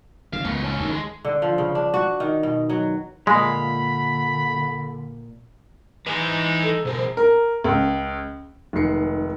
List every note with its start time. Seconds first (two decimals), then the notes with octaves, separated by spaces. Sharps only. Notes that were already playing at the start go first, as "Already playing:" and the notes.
0.33 C#3 F5
0.45 C#2 A3 B3
0.64 C#4 A4
0.77 D2 D#3
0.90 G#3
1.25 D3
1.42 F3
1.58 C#3
1.75 D4
1.94 F#4
2.20 D#3
2.43 B2
2.69 F#3
3.27 A#2 D3 G#3 F5 B5
6.07 E3 G#3 D#4 B4
6.63 A4
6.85 B2 G#4 A#4 C5
7.17 A#4
7.64 C#2
8.73 F1 D#3 G#3 C7 C#7